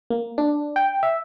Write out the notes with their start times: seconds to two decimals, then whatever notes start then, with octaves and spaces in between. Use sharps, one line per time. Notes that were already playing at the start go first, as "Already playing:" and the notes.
0.10 A#3
0.38 D4
0.76 G5
1.03 E5